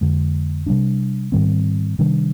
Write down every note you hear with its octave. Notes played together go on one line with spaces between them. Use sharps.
F2 D3 G#3
C3 G3 A#3 D4
G#2 D#3 G3 C4
C3 D#3 G3 D4